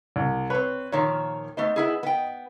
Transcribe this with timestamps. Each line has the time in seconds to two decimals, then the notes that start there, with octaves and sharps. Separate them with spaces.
0.16 C2
0.50 C4 B4 C#5
0.92 A#2 D#3 F3 C#5
1.57 A3 B3 D#4 C5
1.76 B3 E4 G#4
2.03 B3 G5